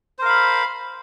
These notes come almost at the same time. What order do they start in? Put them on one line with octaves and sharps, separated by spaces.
C5 A#4 F5 B5